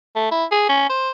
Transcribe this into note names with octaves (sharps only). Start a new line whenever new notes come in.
A3
E4
G#4
C#4
C5